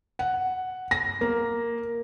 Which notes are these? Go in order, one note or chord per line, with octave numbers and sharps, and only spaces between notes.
F#5
A#6
A#3